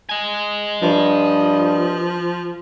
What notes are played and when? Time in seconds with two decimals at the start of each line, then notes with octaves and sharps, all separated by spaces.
0.09 D#5 G#5
0.82 G2 F3